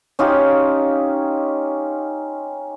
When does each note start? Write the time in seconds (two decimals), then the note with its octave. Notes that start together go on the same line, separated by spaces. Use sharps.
0.19 C#4 D#4 F4 G4